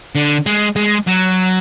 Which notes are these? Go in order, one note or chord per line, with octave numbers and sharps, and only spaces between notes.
D3
G#3
G#3
F#3